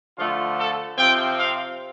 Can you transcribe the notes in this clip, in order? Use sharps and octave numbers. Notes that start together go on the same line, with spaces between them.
D3 F3 A3 F4
A4
C3 F3 C4 G5
F5